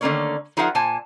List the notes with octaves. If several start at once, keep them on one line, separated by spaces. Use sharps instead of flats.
D3 D#3 A3 A#3 C#4 C#5
F3 D#4 G#4 A#4 E5 F#5
A#2 C5 G#5 A5